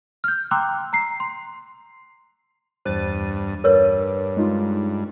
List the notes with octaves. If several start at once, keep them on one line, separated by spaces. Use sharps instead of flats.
F6 G6
G5 A#5 C6 D6 E6 F#6
A#5 C7
C6
E2 G2 C5 A6 D#7
G2 A#4 B4 C#5
G#3 D#4 F4